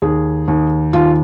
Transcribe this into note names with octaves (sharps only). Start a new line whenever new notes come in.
D#2 G#4
D#2
D#2 F4